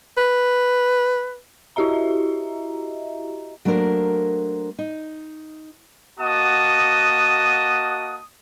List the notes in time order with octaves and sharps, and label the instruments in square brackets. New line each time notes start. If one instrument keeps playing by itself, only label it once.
[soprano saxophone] B4
[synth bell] E4 F#4 G4 D#5 E5 A#5
[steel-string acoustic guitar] F#3 A3 A#3 D4 A#4 C5
D#4
[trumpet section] A#3 F#4 D#5 F#5 A5 D#6